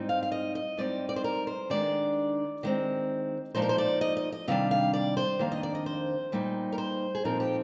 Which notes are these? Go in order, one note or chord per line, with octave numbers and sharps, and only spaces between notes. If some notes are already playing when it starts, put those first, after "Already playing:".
Already playing: G#2 G3 C4 D#4
F5
F5
D#5
D#5
G#2 G3 C4 D#4 D5
D5
C5
A#4
C5
D#3 G#3 D4 D5
D#3 G#3 C4
A#2 F3 G#3 D#4 C5
A#4
C5
D5
D#5
D#5
D#5
C3 D#3 G3 D4 F5
F5
D5
C5
F2 D#3 A#3 D4 F5
D#5
D5
D#5
C5
A#2 G3 A#3 D#4
A#4
C5
G#4
A#2 F3 C4 D#4 A#4
G4